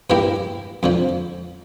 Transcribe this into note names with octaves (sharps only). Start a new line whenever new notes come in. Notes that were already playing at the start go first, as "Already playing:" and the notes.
G2 E3 A#3 E4 G4
F2 D3 F3